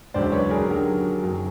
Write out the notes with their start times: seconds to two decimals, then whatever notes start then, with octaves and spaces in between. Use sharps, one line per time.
0.14 E1 D2 C#3 F#3 C5 D5
0.32 B4 C#5
0.50 G#4 A#4
0.68 D#2 D3 F#3
1.22 F#1 F#2 D#3 F#3